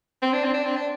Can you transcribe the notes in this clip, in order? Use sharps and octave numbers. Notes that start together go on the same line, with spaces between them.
C4
D4
C4
D4
C4
D4